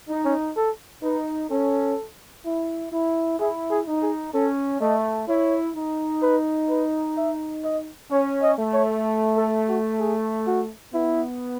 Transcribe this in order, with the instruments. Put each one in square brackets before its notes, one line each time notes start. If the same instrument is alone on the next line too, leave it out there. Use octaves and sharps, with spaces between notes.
[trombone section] D#4
[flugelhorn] C#4
A4
[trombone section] D#4 [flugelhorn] B4
[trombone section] C#4 [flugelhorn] A4
[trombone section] E4
E4
[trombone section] E4 [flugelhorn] G#4
[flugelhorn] G#4
[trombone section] D#4
[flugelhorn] G#4
[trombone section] C#4 [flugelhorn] A4
[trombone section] A3 [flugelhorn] D#5
[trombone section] E4 [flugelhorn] C#5
[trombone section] D#4
[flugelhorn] B4
B4
E5
D#5
[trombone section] C#4 [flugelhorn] C#5
[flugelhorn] D#5
[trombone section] A3
[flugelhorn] C#5
A4
F#4
G#4
F#4
[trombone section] B3 [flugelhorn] E4